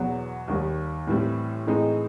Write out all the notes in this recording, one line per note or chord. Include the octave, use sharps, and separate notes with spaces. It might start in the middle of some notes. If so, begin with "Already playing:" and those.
Already playing: E2 B2 F#3 B3
D#2 D#3 G3
A2 E3 G3 C4
A2 E3 G#3 C4 D#4